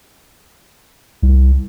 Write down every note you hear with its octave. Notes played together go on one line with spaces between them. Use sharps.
C2